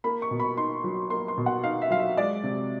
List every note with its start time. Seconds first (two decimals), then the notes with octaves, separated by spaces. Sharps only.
0.04 A#3 B5
0.22 C#6
0.31 B2
0.40 B5
0.57 D#4 C6
0.84 F#3
1.10 A#3 C6
1.28 C6
1.38 B2
1.46 F#5
1.64 D#4 F5
1.82 E5
1.91 F#3 F5
1.99 E5
2.17 G#3 D5
2.43 C3